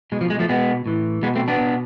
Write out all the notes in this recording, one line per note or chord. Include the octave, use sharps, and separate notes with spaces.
B2 G#3
F3
G#3
F3 A3
B2 G#3 B3
A2 E3
B2 G#3 B3
A3 C4
B3 D4
B2